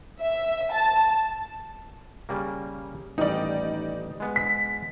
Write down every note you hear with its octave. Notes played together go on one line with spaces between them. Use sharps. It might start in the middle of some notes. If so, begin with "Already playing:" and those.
E5
A5
C#3 G3 A#3
A1 D#3 G3 D#4 D5
G#3 B3
B6